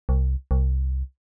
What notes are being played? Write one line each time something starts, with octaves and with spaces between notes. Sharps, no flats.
C2
C2